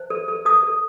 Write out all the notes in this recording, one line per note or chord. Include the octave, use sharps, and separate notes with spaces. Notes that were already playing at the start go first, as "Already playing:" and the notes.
Already playing: C5
A4
A4
A4 D#6
A4